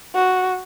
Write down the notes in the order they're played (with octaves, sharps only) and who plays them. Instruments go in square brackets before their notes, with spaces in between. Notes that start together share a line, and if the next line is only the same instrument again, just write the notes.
[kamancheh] F#4